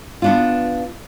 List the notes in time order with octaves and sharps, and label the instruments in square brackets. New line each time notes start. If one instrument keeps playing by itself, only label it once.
[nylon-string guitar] B3 D4 F4